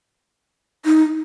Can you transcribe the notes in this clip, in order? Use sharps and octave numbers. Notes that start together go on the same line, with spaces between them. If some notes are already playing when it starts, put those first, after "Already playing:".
D#4